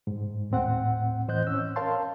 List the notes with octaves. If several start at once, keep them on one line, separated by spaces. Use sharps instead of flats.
G#2
D#2 A2 C4 F#5
A2 E3 C5 D#5 F#6 G6
C#4 E6
A#4 C#5 F5 A5 C6